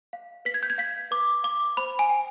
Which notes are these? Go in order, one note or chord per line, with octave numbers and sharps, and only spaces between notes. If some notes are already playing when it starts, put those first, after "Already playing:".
F5
B4 B6
G#6
G6
G#6
F5 B6
B4 D6
F5 D6
C5 B5
G#5
G5